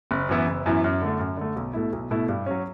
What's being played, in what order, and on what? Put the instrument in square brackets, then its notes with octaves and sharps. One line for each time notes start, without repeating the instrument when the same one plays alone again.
[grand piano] F#1
F#2 E3 B3 E4
F#1
F#2 E3 B3 E4
F#2
D3 A3
F#2
D3 A3
B1
B2 A3 E4
B1
B2 A3 E4
G2
F#3 C#4